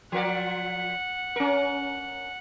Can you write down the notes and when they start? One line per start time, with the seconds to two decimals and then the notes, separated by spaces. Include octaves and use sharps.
0.12 F3 A#4 D5 F#5
1.36 C#4 A#4